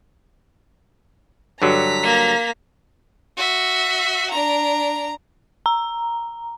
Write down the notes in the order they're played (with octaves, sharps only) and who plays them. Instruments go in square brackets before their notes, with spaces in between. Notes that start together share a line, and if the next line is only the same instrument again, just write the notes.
[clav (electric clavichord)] G2 D3 F#3 [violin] A#5 B6
[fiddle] A#3
[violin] F#4 E5
D4 A#5
[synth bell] A#5